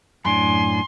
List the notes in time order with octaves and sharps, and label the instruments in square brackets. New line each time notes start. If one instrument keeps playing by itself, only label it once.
[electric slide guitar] F#2 A2 D4 [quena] G#5 [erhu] C6